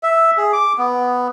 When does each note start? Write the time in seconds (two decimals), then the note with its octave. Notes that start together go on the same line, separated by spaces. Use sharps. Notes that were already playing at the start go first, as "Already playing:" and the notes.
0.03 E5
0.37 G#4
0.53 D6
0.78 B3